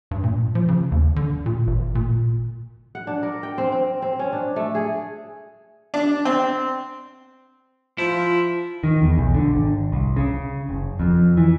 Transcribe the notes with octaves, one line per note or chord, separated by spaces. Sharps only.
G2
A#2
F3
C#3
D#2
D3
A#2
G#1
A#2
F#5
D4
A#4
G5
C4
C4
C4
C#4
D4
A3
G#4
D4
C4
F3 E4 F4
D#3
E2
B1
D3
G#1
C2
C#3
F#1
F2
E3